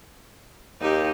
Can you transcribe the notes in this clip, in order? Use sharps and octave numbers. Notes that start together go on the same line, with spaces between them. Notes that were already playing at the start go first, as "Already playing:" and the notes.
D#2 D#4 G4